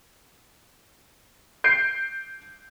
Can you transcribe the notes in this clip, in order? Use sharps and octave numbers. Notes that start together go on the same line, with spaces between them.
G6 C7 D7